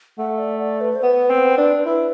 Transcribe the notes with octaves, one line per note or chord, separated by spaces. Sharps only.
A3 F#5
D5
D5
B4
C5
B3 B4
C4
D4
E4 B4